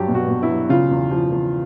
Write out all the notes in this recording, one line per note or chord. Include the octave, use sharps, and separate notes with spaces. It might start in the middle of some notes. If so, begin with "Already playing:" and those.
Already playing: G2 F#3 G4
B2
F#4
B2
E4
F#3
C#3 F4
E2
F3
E2